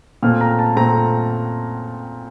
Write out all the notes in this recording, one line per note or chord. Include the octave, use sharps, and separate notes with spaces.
A#2 A3 C4 F6
A#5
A5
A#2 A3 C4 A#5